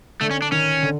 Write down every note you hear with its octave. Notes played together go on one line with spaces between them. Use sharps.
D3 A3
C#4
D4
D#3 C#4
D3